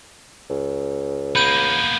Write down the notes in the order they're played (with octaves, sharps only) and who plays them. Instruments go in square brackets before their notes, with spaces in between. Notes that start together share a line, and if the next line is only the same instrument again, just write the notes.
[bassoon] C#2
[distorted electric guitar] A#3 B3 [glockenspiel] B5 G6 D#7